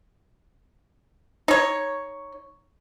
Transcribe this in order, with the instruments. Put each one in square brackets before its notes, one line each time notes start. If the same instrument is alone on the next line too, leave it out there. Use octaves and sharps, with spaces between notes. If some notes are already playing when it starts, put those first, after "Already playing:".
[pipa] D#4 C#5